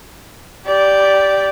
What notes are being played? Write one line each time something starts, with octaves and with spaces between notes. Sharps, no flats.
G4 D5